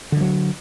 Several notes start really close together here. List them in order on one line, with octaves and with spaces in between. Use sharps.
D3 F3 F#3